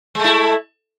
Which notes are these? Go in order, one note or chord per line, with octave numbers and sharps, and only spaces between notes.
G#3 A3 E4